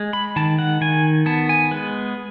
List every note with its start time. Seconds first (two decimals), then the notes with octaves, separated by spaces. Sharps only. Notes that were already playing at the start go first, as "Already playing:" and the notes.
Already playing: G#3
0.13 B5
0.36 D#3 A5
0.59 F#5
0.81 D#3 G#5
1.26 B3 A5
1.49 G#5
1.71 G#3 B4